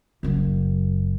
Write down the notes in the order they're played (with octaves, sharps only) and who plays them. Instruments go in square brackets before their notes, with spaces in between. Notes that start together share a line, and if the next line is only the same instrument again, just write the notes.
[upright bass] F#1 F#2